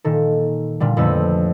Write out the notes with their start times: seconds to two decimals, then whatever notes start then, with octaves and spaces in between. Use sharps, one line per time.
0.04 A#2 D#3 A4
0.80 A#2 D3 G3
0.97 F2 D3 A3 B4 E6